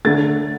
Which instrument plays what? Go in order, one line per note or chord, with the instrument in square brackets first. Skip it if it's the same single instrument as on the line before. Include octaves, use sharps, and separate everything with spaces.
[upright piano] D3 A3 A6